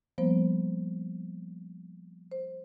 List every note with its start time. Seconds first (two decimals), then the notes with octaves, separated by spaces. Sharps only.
0.18 F3 G3 A#3 B3 C5
2.32 C5